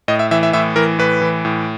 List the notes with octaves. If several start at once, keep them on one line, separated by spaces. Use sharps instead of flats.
A2 D#5
E5
E3 E5
E5
A2 E5
E3 A#4
A2 B4
E3
A2